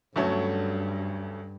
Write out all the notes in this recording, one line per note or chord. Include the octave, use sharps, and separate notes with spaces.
D2 G2 D3 F#3 A3 C#4